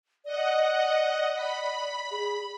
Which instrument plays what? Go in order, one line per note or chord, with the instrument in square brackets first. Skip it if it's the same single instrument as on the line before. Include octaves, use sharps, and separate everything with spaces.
[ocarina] D5 [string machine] D#5 F#5
[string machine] B5
[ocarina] G#4